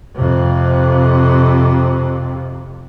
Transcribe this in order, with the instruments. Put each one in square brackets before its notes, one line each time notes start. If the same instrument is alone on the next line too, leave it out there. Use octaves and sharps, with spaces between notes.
[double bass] F2 C3